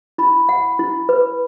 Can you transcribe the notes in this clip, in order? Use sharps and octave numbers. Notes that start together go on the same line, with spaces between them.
E4 B5
F#5
E4
B4